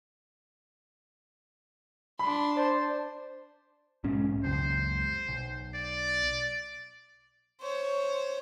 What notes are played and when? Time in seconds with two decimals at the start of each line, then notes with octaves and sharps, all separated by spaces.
2.19 D4 B5 C6
2.57 C5 D5 A5
4.04 B1 G#2 C#4
4.45 C#2 F#2 C5
5.29 B1
5.74 D5
7.61 C5 C#5